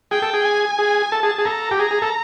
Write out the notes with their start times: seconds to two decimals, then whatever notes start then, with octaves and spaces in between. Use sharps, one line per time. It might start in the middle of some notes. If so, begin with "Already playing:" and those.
0.11 G#4 G5
0.22 A4
0.34 G#4
0.45 G#5
0.79 G#4
1.12 A4 A5
1.23 G#4
1.38 G#4
1.45 A4 A#5
1.71 G4
1.79 G#4 A#5
1.91 G#4
2.02 A4